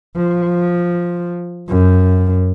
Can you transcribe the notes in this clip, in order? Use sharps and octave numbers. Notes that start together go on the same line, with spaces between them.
F3
F#2